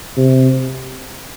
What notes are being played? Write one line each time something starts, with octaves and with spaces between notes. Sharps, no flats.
C3